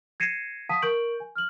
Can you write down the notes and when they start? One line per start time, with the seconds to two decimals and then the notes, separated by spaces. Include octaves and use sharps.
0.20 G#6 A#6 C7 C#7 D#7 E7
0.69 F5 F#5 A5 D#6 B6 D#7
0.82 A#4 C#6 G6 D7 F#7
1.20 G#5
1.36 F6 F#7